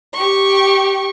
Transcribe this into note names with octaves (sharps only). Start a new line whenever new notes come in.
G4 C#6